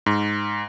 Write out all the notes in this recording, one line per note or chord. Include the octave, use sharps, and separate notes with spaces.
G#2